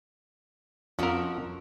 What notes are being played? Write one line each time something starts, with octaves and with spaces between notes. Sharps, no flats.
F2 C4 C#4 F#4 A#4